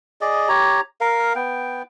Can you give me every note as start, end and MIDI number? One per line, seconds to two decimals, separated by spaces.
0.21 0.49 68
0.21 0.49 74
0.21 0.49 75
0.49 0.81 67
0.49 0.81 73
0.49 0.81 82
1.01 1.33 70
1.01 1.33 77
1.35 1.83 59
1.35 1.83 79